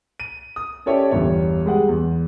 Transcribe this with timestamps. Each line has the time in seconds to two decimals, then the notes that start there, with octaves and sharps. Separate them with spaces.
0.20 D#7
0.56 D#6
0.86 C#4 E4 G4 A4 C#5 D5
1.11 G1 E2 G3 C#5
1.65 G3 G#3 G#4 F#5
1.89 E2